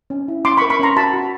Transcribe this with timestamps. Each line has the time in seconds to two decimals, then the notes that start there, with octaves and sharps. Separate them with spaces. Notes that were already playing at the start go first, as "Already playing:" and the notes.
0.10 C#4
0.28 E4
0.45 C#4 C6 D6
0.57 B5 C#6
0.62 A#4
0.70 B5 C#6
0.79 C#4 A#5 C6
0.97 F#4 A5 B5
1.14 F#4